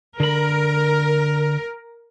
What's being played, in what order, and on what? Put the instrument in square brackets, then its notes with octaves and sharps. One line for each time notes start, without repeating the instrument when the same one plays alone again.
[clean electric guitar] D3 B5 [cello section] A#4